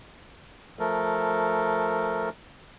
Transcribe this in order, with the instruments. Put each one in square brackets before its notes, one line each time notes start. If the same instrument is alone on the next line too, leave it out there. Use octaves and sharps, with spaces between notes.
[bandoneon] F3 A3 A4 A#4